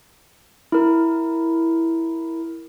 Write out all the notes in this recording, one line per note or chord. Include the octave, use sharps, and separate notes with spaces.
E4 A#4